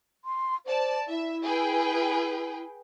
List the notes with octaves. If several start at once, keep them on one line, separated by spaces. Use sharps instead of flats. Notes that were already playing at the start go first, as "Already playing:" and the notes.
C6
C5 D5 A5
E4 E5
G#4 B4 G5